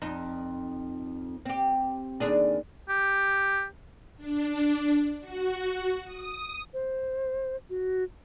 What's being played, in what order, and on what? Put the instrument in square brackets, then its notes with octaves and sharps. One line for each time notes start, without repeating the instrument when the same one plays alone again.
[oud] F2 D#4
C4 G4
D#2 D4 G#4
[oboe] G4
[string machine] D4
F#4
D#6
[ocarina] C5
F#4